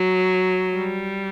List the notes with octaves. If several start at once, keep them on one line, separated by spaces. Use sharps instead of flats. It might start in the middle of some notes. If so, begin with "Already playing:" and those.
Already playing: F#3
G3